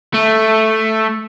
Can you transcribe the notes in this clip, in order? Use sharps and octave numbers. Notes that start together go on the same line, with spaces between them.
A3